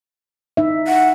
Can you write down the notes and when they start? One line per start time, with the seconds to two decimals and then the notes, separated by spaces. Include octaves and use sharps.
0.57 D#4 E5
0.88 F#5